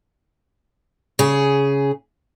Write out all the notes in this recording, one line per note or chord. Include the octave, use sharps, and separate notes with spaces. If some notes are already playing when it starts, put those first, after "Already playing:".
C#3 G#4